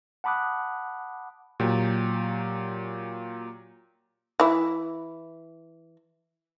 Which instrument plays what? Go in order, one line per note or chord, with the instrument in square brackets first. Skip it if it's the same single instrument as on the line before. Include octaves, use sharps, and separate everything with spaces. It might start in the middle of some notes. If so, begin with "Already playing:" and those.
[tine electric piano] F#5 A5 B5 D6 D#6 F#6
[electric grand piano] A#2 F#3 G4
[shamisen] E3 E4